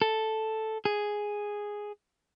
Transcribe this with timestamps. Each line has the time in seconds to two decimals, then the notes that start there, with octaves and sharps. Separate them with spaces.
0.02 A4
0.85 G#4